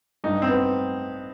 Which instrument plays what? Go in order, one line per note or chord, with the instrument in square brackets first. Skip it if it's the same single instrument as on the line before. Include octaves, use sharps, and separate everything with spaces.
[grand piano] G2 [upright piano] D#4
[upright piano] C4
[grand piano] B3